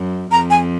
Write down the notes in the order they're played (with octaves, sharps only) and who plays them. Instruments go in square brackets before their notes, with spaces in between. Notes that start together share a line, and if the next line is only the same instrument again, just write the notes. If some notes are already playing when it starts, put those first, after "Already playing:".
Already playing: [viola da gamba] F#2
[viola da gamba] F2 [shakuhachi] A#5
[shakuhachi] G#5